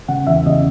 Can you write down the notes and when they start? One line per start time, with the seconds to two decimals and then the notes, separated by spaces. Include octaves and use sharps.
0.08 C#3 F#5
0.27 E2 E5
0.46 C#3 D#5